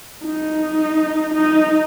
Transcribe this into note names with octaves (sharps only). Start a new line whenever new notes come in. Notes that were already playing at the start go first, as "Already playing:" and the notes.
D#4
D#4